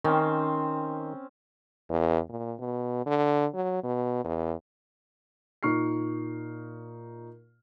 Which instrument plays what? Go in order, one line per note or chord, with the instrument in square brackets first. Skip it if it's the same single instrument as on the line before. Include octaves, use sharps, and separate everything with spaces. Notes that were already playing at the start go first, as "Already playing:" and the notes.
[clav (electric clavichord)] D#3 [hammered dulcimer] C4 C#4
[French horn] E2
A#2
B2
D3
F#3
B2
E2
[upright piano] A#2 D#4 C#6 F6 C7